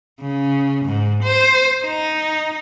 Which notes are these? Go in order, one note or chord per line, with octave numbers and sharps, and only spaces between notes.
C#3
G#2
C5
D#4